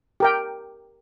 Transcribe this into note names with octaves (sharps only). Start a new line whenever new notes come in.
G4 A#4 G5